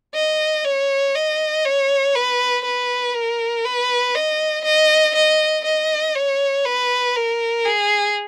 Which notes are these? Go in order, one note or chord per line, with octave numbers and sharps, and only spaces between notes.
D#5
C#5
D#5
C#5
B4
B4
A#4
B4
D#5
D#5
D#5
D#5
C#5
B4
A#4
G#4